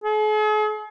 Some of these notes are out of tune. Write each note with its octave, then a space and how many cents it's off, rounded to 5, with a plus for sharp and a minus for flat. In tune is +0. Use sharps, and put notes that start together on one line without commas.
G#4 +45